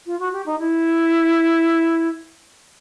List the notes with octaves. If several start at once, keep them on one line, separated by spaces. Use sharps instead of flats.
F4
F#4
G4
D#4
E4